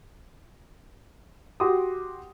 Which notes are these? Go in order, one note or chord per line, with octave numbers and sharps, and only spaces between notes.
F#4 G4 F#5 C6 D6 D#6